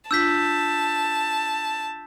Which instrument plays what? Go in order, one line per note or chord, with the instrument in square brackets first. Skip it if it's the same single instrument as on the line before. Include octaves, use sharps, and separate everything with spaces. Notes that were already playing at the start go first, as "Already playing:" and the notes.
[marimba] D4 F4 [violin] A5 [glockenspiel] E6 G6 B6